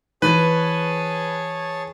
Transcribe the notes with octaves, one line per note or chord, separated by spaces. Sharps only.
E3 G#4 B4 C#5 A5